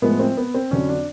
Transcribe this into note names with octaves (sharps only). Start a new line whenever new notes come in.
A2 F3 G#3 B3
C4
B3
C4
F2 D3 F#3 C#4
D4